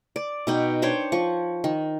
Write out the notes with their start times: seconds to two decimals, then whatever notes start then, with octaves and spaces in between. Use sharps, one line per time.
0.16 D5
0.47 B2 D#4 G5
0.82 D4 C5 C#5 G5
1.12 F3 C#6
1.64 D#3